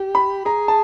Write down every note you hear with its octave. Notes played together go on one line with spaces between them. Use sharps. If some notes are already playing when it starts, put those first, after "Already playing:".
Already playing: G4
B5
G#4 A#5
A5